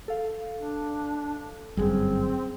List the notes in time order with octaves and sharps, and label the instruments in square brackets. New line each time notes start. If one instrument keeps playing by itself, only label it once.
[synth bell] A4 F5
[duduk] D4
[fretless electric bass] G1 F#2 [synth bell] G3 G#4 [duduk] C4